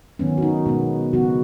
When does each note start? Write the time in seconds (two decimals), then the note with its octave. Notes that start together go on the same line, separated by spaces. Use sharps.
0.19 D#3 F#3 B3 C#4
0.38 F#4
0.42 D#4
0.66 B2 G#3 B3
1.13 C#3 F#3 B3 F#4